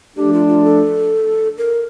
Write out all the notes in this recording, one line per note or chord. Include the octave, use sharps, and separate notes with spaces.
F3 A3 D4 G4
F4
F4
A4
A#4